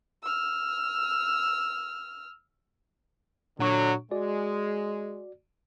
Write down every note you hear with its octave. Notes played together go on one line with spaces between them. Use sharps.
E6 F6
A#2 D3 F#3 D4 C#6
G#3 F#4 D5